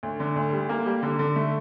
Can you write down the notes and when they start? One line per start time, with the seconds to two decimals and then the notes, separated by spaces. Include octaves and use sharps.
0.03 D2
0.20 D3
0.36 D2
0.53 G3
0.69 A#3
0.86 G3
1.03 D3
1.19 D3
1.36 A3